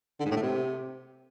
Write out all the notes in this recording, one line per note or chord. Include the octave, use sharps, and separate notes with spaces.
D3
G#2
A2
A3
C3